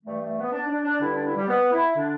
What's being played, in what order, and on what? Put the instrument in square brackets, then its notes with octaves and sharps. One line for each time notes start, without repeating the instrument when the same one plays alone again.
[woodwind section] G2 E3 A3
A3
B3
D4
D4
D4
G2 D3 E4
D4
E4
G3
B3
E4
D3 D4